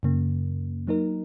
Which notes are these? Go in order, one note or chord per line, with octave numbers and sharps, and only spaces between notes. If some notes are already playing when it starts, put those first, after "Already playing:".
F#2 C#3 A#3
F#3 A#3 D#4 A#4